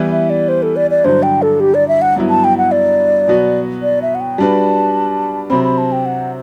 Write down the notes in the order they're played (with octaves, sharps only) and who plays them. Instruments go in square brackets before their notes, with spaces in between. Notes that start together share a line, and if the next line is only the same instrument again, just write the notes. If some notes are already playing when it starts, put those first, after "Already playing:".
Already playing: [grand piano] E3 G3 B3 E4
[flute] E5
D5
C5
A4
D5
D5
[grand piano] G2 D3 F#3 [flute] C5
[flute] G5
A4
G4
D5
E5
F#5
[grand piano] G2 F#3 B3 E4
[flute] A5
G5
F#5
D5
[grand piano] B2 F#3 B3 F#4
[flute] D5
E5
F#5
G5
[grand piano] G3 D4 F#4 B4 [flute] A5
[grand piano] C3 F#3 C4 [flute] B5
[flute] B5
A5
G5
F#5